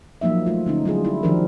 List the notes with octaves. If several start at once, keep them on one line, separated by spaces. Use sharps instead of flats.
F3 F#3 A#3 D#4 E5
A3 F4
D3 C#4 D#4
F#3 G3 F4 G#4
E4
D#3 F3 D4 G4 A#4